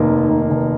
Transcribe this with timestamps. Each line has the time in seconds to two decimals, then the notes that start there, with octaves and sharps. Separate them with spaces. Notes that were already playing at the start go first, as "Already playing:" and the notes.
Already playing: F1 D#2 A#3
0.09 D#3
0.30 F1
0.50 F1